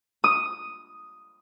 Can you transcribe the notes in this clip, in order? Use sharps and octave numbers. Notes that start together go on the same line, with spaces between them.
D#6